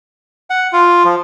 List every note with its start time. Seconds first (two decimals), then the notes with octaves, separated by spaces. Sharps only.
0.50 F#5
0.73 F4
1.04 F3